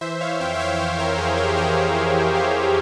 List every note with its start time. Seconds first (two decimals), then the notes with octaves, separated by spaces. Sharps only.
0.01 E3 C5 E5
0.21 C#5 F5
0.40 F2 E5 G5
0.54 E5
0.59 C#5 F5
0.79 E3 C5 E5
0.99 A#4 C#5
1.18 F2 G#4 C5
1.38 G4 A#4
1.57 E3 G#4 C5
1.96 F2
2.34 F2 G4 A#4